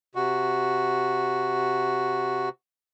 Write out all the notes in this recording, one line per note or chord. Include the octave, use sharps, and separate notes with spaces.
C3 F#4